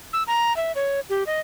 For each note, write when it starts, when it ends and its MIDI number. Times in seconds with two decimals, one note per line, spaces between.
0.13 0.23 88
0.27 0.55 82
0.57 0.72 76
0.76 1.00 73
1.10 1.24 67
1.27 1.40 75